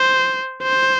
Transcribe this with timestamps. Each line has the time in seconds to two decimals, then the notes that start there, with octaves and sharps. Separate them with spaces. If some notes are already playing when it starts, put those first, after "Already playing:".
Already playing: C5
0.63 C5